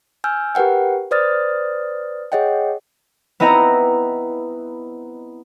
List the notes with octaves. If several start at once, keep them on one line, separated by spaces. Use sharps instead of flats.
G#5 E6 F6 G6
G4 A#4 B4 F#5 G5
B4 C5 D5 D#6 F6 A6
G#4 C#5 D#5 F#5 G5
B3 C4 E4 D#5 A#5